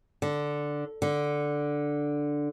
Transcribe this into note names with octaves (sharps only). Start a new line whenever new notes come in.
D3
D3